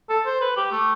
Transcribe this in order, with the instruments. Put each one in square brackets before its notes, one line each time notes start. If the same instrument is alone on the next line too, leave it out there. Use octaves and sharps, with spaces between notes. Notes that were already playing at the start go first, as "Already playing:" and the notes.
[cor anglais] A4
C5
B4
G4
A3